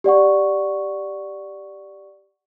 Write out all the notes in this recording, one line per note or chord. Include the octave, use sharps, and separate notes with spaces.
G4 D5 F#5 C#6